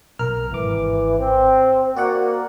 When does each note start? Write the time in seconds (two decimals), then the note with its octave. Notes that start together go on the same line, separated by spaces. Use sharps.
0.19 B1 A#4 F6
0.52 G#1 E3 D6
1.19 C4
1.96 A#3 F#4 D5 F#5